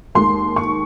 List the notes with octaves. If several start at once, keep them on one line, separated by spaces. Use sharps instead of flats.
D#2 D#3 G#3 C6
C#6